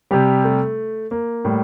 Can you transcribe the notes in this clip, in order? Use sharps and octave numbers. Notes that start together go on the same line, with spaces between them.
C3 G3 G4
A3
A#3
A2 G3